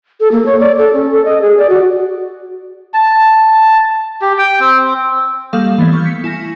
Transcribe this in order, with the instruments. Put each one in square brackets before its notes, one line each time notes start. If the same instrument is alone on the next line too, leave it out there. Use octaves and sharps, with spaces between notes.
[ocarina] A4
A#3
C#5
D5
A4
C#4
A4
D#5
G#4
D5
F#4
[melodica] A5
G4
G5
C4
[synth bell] G3 A#3 A4 F5 C#6 D#6
E3 A3 B3 G#6
C#6 F6 G6
B6 C#7
E4 G#5 A#6